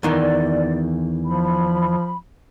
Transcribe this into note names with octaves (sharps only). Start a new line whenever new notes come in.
E2 D#3 E3 D5
F3 B5